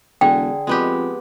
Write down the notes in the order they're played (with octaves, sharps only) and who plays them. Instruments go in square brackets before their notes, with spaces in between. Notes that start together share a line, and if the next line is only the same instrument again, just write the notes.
[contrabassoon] E1 [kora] D3 G#4 [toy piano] G5
[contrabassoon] F2 [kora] G#3 B3 G4